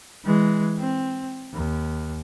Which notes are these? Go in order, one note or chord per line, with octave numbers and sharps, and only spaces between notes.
E3 G#3
C4
D#2